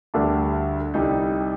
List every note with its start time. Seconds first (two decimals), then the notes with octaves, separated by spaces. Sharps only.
0.14 D2 D3 G3 D4
0.94 C2 C3 G3 D#4